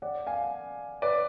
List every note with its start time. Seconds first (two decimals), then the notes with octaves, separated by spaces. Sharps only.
0.02 D5 F#5
0.27 F5 G#5
1.02 B4 D5